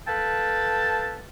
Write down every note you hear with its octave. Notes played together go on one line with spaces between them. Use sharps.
A4 B4 F5 G5 A5